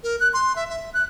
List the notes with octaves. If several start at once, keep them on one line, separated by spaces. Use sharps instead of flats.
A#4
F#6
C6
E5
E5
F#6